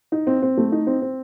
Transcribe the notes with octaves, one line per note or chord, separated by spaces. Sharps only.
D#4
C4
C4
A3
D#4
C4
C4